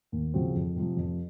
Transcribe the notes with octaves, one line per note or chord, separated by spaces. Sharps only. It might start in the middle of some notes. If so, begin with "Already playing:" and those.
D#2
C#3 F3 C4 F#4
F2
C3 F3
F2